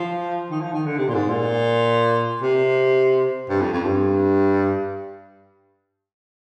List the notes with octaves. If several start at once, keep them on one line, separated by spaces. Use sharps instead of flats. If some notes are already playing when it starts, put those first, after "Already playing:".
Already playing: F3
D#3
F3
D#3
D3
C3
A#2
G#2
A#2
C3
G2
F2
F2
G2